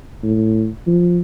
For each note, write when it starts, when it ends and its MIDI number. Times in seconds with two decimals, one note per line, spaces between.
0.23 0.68 45
0.87 1.21 53